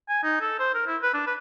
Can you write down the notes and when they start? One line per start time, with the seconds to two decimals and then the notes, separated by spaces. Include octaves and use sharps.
0.09 G#5
0.24 D#4
0.41 A4
0.60 C5
0.74 A#4
0.87 E4
1.02 B4
1.14 D4
1.26 B4